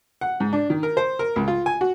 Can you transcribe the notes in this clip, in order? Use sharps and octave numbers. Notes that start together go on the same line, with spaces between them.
F#5
G#2
D4
D#3
A#4
C5
A#4
C#2
F4
G#5
F#4